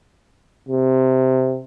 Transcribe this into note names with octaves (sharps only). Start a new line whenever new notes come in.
C3